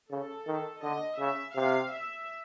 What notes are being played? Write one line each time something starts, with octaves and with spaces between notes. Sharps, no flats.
C#3 A4
D#3
D3 D#5
C#3 E5
C3 F5
E5